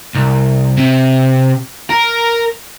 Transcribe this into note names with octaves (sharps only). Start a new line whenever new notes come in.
C2
C3
A#4